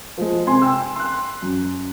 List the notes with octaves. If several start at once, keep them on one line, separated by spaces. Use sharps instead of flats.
F3 G#3
C3 G#5 C6
G5 E6
C6 F#6
F#2